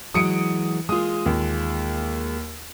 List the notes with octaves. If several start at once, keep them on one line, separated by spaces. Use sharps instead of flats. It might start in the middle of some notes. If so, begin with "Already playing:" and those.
E3 F#3 G#3 D#6 C#7 D7
G#3 A#3 F4 D#6
D#2